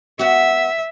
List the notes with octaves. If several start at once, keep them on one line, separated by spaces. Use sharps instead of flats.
B3 F#4 E5